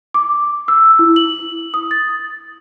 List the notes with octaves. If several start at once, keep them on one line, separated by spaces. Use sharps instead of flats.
D6
E6
E4
F#7
D#6
A6